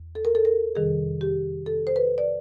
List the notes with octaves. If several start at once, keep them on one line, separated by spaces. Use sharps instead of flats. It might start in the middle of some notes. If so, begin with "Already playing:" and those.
Already playing: E2
A4
A#4
A4
A#4
F2 C3 D#3 G3 G#4
G4
A4
C5
B4
D5